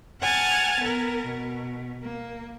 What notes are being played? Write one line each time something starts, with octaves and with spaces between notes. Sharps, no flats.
F#5 G#5 A5 F6 A6
B3 A#4
B2
A#3